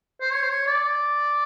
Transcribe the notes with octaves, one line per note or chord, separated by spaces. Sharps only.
C5
C#5
C5
C#5
D5